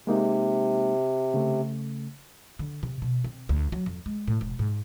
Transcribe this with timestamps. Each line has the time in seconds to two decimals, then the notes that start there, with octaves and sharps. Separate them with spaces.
0.07 C3 G#3 A#3 D#4
1.34 C#3 A3
2.59 D3
2.83 C3
3.02 B2
3.24 C4
3.49 D2
3.72 F#3
3.86 F2
4.06 G#3
4.28 A2
4.41 E1
4.59 G#2